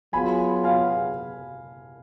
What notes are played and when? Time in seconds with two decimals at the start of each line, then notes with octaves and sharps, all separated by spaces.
0.13 F#3 B3 F4 G#4 G#5 B5
0.64 F5 G#5